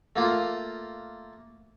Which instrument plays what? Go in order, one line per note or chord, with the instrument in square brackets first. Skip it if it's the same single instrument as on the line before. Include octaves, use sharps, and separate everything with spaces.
[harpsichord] A3 A#3 F4